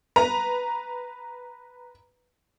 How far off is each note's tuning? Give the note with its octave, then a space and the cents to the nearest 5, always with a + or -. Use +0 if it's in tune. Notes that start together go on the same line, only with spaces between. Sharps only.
B4 +0 A#5 +0